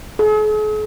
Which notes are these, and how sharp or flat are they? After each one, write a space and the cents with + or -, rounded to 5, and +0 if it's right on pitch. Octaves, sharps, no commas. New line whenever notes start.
G#4 +45